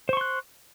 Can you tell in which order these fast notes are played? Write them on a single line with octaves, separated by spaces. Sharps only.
C5 C#6 C6 F#6